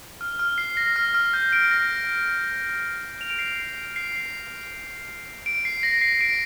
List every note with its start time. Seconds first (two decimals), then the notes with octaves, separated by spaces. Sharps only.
0.21 F6
0.39 F6
0.58 C7
0.77 A#6
0.96 F6
1.14 F6
1.34 G6
1.53 D7
1.71 A#6
3.21 F7
3.30 D7
3.39 C7
3.48 D7
3.96 C7
5.46 D7
5.65 C7
5.83 A#6
6.01 C7
6.21 D7